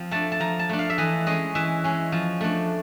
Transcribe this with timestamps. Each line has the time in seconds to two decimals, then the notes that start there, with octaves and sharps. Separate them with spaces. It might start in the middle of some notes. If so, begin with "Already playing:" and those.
Already playing: F3 C4
0.11 A3 D4 A5
0.32 A5
0.40 F3 A#5
0.59 A5
0.69 A3 D4
0.79 F5
0.90 E5
0.98 E3 D#5
1.27 G#3 C#4 D#5
1.55 E3 E5
1.84 G#3 C#4
2.12 F3
2.41 A3 D4